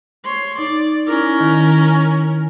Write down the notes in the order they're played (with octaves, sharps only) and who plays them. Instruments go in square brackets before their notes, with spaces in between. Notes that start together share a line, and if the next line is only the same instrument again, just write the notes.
[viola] C#5 C6
[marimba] D#4 [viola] D5
[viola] C#4 A#4 [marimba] E4
[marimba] D#3 E4